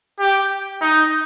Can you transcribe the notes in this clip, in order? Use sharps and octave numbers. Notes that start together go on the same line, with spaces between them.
G4
D#4